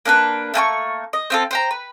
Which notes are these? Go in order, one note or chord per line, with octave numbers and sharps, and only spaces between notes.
A#3 D4 A#4 B4
A3 A#3 G#5 C#6
D#5
C4 F4 A4
C5 G5 A#5
B4